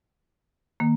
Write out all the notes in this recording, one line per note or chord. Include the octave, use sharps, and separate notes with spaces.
D#3 A#3